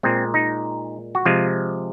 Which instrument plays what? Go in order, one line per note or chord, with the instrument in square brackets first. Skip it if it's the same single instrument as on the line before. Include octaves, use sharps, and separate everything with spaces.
[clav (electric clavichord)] A#2 G#3 C4
D#4
F#4
C3 F3 G#3 F4